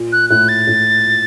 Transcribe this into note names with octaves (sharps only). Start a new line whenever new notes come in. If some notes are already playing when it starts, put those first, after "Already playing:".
Already playing: A#2
F#6
A2 F#6
A6
A2
A#2